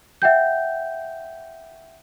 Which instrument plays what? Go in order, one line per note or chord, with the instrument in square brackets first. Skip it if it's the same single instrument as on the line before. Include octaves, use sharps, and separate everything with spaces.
[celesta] E5 F#5 G5 G6